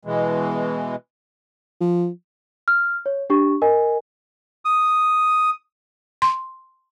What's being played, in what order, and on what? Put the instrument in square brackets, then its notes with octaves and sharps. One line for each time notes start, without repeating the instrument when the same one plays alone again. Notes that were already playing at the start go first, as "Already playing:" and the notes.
[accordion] B2 E3 G#3
[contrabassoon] F3
[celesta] F6
C#5
D4 G4 C#6
A#4 D#5 G#5
[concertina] D#6
[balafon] C6